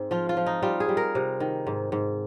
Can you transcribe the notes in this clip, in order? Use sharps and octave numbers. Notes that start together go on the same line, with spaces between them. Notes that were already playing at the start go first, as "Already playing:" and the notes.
Already playing: G#2 C4
F3 F4
F4
F3
D#4
G3 F4
G#4
G3
A#4
C3
D#3
G#2
G#2